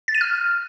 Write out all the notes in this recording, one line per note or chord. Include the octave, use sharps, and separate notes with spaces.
A6
D#7
F6